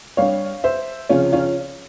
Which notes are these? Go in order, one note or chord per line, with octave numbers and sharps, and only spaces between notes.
G2 G3 C#5 F5
C5 E5
C#2 C3 F3 C#4 F4
C#4 F4